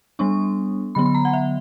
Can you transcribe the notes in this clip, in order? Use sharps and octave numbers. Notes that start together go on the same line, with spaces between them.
G3 B3 D4 C#6
D3 F#3 B3 B5
B5
A#5
F#5
E5